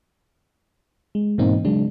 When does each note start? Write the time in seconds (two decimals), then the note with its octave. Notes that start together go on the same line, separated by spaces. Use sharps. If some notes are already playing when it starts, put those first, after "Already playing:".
1.15 G#3
1.38 G#2 B2 E3 A#3 C4 D#4
1.65 C#3 F#3 G#3 D4